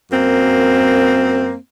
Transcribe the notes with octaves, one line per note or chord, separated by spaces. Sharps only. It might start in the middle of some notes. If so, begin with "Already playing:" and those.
F#2 A#3 C4